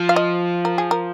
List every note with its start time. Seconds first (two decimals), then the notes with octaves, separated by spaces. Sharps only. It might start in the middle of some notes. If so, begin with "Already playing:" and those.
Already playing: F3
0.09 F5
0.16 D#5
0.65 A#4
0.78 G#4
0.91 A#4